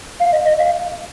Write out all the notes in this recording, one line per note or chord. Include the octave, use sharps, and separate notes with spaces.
F5
D#5
D#5
F5